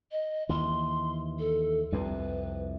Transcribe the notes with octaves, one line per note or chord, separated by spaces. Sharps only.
D#5
D#2 E3 C6
A4
C2 F2 C3 B4